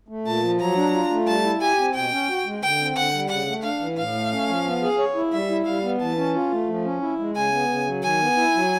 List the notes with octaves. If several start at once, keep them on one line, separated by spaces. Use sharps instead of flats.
A3
A#2 A5
F3
F#3 A#5
D4
F4
A3
G3 A5
E4
G4 G#5
C4
B2 G5
C#4
F#4
G#3
D3 G5
C4
D3 F#5
G3
C#3 F#5
A3
D4 F5
E3
A2 F5
A3
C#4
F3
B3
G#4
C#5
E4
G3 E5
E4
G3 F5
B3
E3 A5
C#4
F4
A3
F3
C#4
E4
G#3
C#3 G#5
B3
C#3
F#3
D#3 G#5
B3
E4
F#3